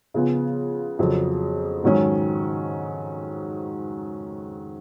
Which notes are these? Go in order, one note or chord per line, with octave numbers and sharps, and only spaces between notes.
C#3 F3 B3 F4 G#4
F2 C#3 F#3
G#2 D#3 F#3 C#4